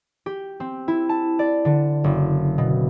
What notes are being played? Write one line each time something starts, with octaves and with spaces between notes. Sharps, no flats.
G4
C4
E4
A5
D5
D3
F#1
B2